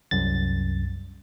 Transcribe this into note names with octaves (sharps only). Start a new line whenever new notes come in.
C2 F#2 A6